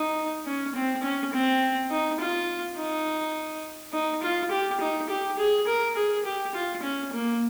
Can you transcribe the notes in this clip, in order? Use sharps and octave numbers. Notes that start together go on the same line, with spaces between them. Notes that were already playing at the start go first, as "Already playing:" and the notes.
Already playing: D#4
C#4
C4
C#4
C4
D#4
F4
D#4
D#4
F4
G4
D#4
G4
G#4
A#4
G#4
G4
F4
C#4
A#3